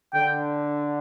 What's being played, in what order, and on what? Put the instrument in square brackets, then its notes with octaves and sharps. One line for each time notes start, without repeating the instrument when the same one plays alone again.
[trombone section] D3 [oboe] G5